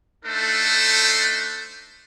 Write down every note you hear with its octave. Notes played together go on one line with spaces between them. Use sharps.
A3 D4 D#4 A4 C5